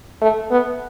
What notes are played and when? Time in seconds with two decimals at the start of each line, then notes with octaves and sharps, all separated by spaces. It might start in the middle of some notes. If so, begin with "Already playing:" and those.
0.22 A3
0.51 B3